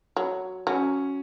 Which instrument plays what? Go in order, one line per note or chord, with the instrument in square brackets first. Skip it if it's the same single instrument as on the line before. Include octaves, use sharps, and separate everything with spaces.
[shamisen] F#3
[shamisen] F#3 [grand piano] C#4